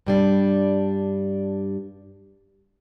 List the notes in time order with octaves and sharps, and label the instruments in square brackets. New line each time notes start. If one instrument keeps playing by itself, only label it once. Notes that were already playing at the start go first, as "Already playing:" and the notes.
[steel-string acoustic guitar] G2 G3 D4